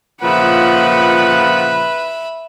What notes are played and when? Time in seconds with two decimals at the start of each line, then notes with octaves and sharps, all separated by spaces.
0.23 A#2 C#3 F3 B4 E5 F#5 B5